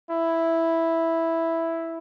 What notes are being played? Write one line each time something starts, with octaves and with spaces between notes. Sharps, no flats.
E4